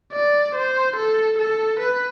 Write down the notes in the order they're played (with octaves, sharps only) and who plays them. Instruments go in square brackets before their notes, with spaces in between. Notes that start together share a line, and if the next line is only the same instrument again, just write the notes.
[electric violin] D5
C5
A4
A4
B4